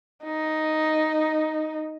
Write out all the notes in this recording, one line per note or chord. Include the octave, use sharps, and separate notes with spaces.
D#4